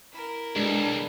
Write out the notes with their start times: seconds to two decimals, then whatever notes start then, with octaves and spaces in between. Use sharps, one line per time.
0.12 E4 A#4
0.56 B1 G#3 D4